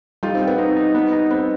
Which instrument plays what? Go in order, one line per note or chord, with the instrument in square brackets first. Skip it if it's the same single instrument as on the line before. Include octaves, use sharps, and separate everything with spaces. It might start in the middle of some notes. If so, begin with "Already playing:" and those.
[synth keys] G3 [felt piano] D#4 F4
[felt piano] C4
[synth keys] G3
[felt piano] B3
[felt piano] C4 [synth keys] D#4
[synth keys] D#4
B3
D#4
[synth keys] B3 [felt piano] C4